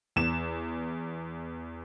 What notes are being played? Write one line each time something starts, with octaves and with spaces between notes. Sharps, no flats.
E2 E7